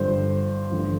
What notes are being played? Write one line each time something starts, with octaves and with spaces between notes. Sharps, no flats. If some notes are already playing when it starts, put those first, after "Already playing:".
Already playing: G1 G2 D3 C5
A1 G2 D3